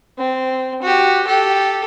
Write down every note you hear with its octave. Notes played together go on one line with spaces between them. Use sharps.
C4
F#4 G4
G4 A4